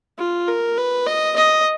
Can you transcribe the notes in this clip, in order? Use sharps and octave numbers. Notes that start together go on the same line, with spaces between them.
F4
A#4
B4
D#5
D#5